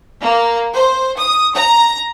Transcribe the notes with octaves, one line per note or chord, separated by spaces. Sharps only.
A#3
C5
D#6
A#5